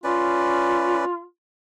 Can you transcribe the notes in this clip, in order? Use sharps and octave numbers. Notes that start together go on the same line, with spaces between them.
C#4 F4 B4 D5